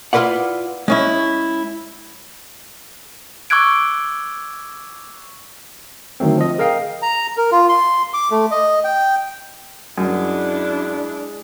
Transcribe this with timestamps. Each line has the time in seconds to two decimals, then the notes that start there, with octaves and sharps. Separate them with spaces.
0.13 E4 F4 A4 B4 D5 F#5
0.88 G#3 C#4 E4
3.50 C#6 D6 E6 F#6 G#6 D7
6.20 D3 D#3 F#3 A3 C4
6.38 F3 D#5
6.58 G#4 A#4 D#5 F5 G5
7.02 A#5
7.37 A#4
7.52 F4
7.69 C6
8.13 D6
8.31 A3
8.51 D#5
8.84 G5
9.98 F#2 G#3 D4 E4